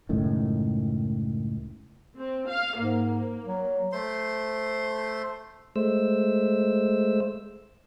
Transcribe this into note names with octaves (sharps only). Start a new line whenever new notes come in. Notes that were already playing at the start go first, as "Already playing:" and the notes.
C#2 F#2 A2 D#3
C4
F5
G#2 A#3
F#3
A3 C5 C6
G#3 A3 C5 E6